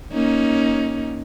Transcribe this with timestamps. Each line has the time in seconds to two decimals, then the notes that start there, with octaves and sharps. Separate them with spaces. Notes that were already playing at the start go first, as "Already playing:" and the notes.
0.12 A#3 C#4 D#4